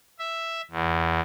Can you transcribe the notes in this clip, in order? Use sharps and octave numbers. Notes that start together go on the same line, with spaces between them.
E5
E2